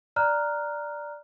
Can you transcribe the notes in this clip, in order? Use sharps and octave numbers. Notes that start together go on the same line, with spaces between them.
D5 A#5 F6 F#6